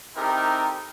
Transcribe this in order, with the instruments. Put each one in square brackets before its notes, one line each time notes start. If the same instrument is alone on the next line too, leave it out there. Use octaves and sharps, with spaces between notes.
[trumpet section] C4 D#4 E4 G4 A4 A#4